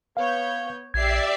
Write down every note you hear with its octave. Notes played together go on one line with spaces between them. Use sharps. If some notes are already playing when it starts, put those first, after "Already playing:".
B3 C#5 F5 G6
A#1 G4 D5 E5 G#6 C7